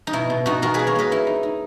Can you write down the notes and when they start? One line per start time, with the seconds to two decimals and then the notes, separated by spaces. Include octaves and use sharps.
0.07 D#4
0.13 B2 E4
0.30 B2
0.46 B2 D#4 F#4
0.62 B2 F#4 A#4
0.74 A#3 G#4 B4
0.87 A#4 C#5
0.95 A#3 B4 D#5
1.11 D#4 E4
1.27 D#4
1.43 D#4